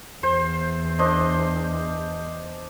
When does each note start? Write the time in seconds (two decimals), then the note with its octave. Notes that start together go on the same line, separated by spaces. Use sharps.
0.23 E2 C5
0.99 D4 C5 D#5